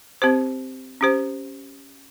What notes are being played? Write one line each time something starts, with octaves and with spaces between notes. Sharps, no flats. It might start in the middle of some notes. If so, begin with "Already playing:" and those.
C4 G4 C5
C#4 G4 C5